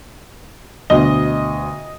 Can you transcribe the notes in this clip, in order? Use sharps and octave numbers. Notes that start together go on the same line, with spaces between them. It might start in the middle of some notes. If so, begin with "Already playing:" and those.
D2 B2 D#5 G7